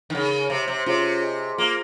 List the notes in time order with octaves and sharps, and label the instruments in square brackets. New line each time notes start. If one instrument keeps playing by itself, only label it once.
[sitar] D#3
[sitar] C#3 [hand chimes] D#4 A#4 F5
[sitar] C3 [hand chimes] G4 C#5 F5
[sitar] C3
[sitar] C3 [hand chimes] C#4 F4 G#4 C#5 F5
[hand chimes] G#4 D#5 G#5
[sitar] A#3 [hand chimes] F4 G#4 C5 F5